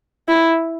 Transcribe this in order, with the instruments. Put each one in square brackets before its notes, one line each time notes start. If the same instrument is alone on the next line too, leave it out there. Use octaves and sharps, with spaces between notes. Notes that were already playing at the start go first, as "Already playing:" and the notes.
[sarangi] E4